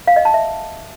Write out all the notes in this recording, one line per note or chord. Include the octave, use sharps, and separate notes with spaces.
F5
D#5
A5
E5